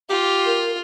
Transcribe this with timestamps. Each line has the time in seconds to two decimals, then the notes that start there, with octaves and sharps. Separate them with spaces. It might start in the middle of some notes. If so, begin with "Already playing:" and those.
0.10 F4 G4
0.46 A#4